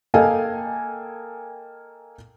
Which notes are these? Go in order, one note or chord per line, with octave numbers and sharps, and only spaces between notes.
A#3 A4 D#5 F5 G5 G#5